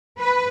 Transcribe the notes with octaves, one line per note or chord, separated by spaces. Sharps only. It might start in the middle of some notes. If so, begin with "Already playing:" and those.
B4